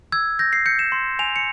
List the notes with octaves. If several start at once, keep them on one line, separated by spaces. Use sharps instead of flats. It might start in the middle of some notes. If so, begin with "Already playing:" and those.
E6 G#6
G6 A#6
C7
G6 C#7
E7
C6
G#5 F7
C#7